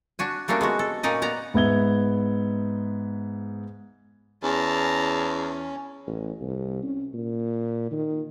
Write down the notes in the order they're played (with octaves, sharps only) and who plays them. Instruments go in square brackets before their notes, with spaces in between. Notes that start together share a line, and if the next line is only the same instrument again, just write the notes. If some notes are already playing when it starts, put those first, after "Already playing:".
[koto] D4 F#4 G#5
G3 A3 A#3 C#4 D4 F#4
G#3 B3 F#4
A4
A#2 C#4 D#4 D5 D#5
B3 D5 A#5
[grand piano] G#2 B3 E5 G#6 G7
[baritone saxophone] E2 [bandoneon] C#4 [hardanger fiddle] A5 A#5
[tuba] A1
C2
C#4
A#2
D#3